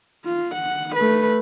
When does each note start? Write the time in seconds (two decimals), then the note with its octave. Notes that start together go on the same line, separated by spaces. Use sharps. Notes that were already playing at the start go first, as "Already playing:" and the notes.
0.25 F4
0.55 F#5
0.96 A3 B4